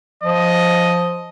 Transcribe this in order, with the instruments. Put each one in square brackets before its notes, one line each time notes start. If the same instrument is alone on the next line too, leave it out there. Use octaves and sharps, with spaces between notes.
[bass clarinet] F3 [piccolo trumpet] D#5